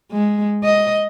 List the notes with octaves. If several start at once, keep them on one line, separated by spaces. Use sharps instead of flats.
G#3
D#5